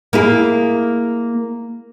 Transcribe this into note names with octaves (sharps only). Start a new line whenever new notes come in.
A#3 E4 G#4